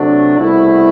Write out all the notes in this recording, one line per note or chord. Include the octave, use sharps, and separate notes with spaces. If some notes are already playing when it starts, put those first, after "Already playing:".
Already playing: C3 F#3 A3 D4 F#4
C2 B2 A3 E4